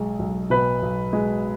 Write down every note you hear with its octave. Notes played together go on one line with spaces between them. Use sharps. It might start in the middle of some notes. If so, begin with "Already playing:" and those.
Already playing: B1 G#3
B1
B2 B4
B1
G#3